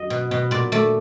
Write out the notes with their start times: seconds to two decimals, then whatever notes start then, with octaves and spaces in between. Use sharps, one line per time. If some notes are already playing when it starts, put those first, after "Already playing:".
Already playing: F#2 F#3 D#5
0.10 B2
0.31 B2
0.51 A#2 D5
0.72 A3 D5